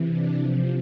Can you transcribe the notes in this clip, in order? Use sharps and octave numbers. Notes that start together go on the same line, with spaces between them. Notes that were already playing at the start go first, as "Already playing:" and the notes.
Already playing: C3 E3
D4
C3 F3